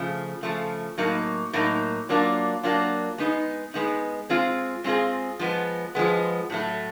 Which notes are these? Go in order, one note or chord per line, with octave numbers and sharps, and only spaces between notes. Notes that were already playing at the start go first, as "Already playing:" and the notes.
Already playing: C#3 F3 A3
C#3 F3 A3
A2 F#3 A#3 D#4
A2 F#3 A#3 D#4
F#3 A#3 D4 F4
F#3 A#3 D4 F4
G#3 B3 D#4
G#3 B3 D#4
G#3 C4 F4 G#4
G#3 C4 F4 G#4
F3 G#3 B3
F3 G#3 B3
A2 F#3 A3